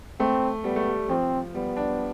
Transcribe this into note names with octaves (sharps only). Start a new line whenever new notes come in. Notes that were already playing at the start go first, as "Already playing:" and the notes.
A3 C4
G3 B3
A3
G3
F3 C4
G3 B3
D4